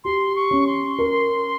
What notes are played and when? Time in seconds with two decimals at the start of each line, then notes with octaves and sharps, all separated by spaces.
0.04 G4 C6
0.36 C#6
0.51 C#4
0.67 C6
0.99 A#4